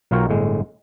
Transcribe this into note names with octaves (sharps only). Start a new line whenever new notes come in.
B1 F#3 F4 A#4 C#5 G5
G1 A2 G#3